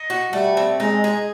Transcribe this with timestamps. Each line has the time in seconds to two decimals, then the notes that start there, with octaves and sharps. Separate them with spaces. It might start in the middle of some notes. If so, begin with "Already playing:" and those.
Already playing: D#4
0.10 F#4
0.33 G3 A3
0.57 C4
0.80 G#3 D#4
1.04 G#4